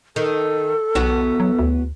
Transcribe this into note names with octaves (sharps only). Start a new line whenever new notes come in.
D#3 A4
B1 E2 B3 F#4
F#3
D2